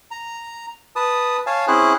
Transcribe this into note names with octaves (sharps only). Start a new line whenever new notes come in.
A#5
B4 A5 D#6
C#5 F5 G#5 A5
C4 C#4 E4 G#4 C5 F#6